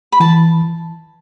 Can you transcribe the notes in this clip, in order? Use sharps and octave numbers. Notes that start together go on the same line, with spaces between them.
B5
E3 A5